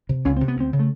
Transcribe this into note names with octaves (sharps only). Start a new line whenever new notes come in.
C3
C#2 C#4
C3 C4
B3
D2 C4
C#3
A3